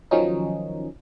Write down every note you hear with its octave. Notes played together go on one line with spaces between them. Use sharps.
D#3 F3 F#3 C#4 D#4